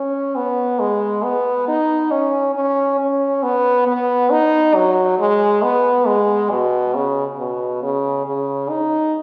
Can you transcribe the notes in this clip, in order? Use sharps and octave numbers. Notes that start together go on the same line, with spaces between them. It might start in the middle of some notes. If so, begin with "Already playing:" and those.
Already playing: C#4
B3
G#3
B3
D#4
C#4
C#4
C#4
B3
B3
D#4
F#3
G#3
B3
G#3
B2
C#3
B2
C#3
C#3
D#4